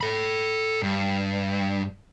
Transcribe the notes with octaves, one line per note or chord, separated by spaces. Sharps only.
A4 B5
G2